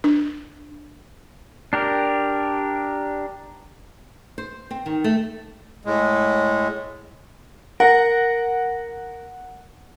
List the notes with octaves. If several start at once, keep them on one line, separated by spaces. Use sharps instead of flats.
D4
D4 G4 A#4
C5
C4
D#3
A3
A2 G#3
A#4 F#5